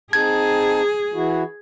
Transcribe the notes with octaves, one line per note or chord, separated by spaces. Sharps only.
C4 D#4 G#4 A5 G#6
E3 E4 F#4